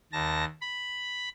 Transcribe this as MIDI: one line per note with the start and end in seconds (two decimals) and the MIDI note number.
0.12 0.45 39
0.12 0.45 81
0.12 0.45 94
0.61 1.29 83